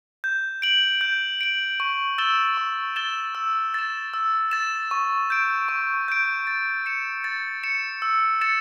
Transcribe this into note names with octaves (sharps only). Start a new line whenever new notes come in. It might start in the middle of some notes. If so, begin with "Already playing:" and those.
G6
D7 F#7
G6
D7 F#7
C#6
E6 A6 E7 G7
C#6
E6 A6 E7 G7
E6
A6 E7
E6
A6 E7
C#6
G6 D7
C#6
G6 D7
A6
C#7 E7
A6
C#7 E7
E6
A6 C#7 E7